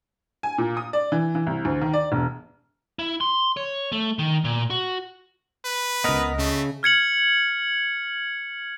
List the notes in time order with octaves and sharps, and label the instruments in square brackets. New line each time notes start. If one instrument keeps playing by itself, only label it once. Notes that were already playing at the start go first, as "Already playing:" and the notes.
[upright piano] G#5
A#2
D#6
D5
E3
E3
C2
D2
D#3
D5
E1
[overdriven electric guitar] E4
C6
C#5
A3
D#3
A#2
F#4
[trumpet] B4
[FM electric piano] C#2 D#5 [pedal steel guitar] B3 A#4
[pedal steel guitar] C#3 [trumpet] A3
[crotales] F6 G#6 C#7 F#7